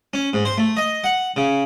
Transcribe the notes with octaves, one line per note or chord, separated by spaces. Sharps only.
C#4
G#2
C5
A3
D#5
F#5
C#3